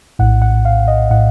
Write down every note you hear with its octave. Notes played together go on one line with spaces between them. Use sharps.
A#1 A2 F#5
F#5
F5
D#5
A2 F#5